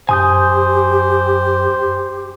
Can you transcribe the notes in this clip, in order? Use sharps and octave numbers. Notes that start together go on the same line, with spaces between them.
F#2 G4 C5 G#5 D#6 G6